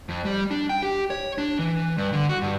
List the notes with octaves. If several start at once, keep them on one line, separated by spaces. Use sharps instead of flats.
F2
G3
D4
G5
G4
C#5
D4
E3
G2
D3
F#4
G2